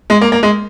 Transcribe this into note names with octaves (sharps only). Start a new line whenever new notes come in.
G#3
A#3
A#3
G#3